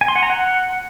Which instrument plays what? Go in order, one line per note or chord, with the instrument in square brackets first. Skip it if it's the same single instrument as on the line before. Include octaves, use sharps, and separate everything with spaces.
[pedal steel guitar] G#5
C6
F#5
A#5
F#5